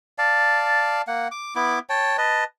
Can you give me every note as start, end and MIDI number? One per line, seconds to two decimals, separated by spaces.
0.18 1.02 74
0.18 1.02 77
0.18 1.02 81
1.07 1.28 58
1.07 1.28 78
1.32 1.54 86
1.56 1.79 59
1.56 1.79 64
1.56 1.79 86
1.89 2.17 73
1.89 2.17 79
1.89 2.17 81
2.18 2.44 71
2.18 2.44 75
2.18 2.44 81